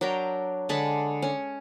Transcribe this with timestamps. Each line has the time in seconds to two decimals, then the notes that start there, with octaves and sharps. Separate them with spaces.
0.01 F#3 D4 A#4 G5
0.69 D3 G#3 A5 B5
1.22 C#4